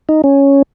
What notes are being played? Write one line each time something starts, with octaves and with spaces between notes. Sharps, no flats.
D#4
C#4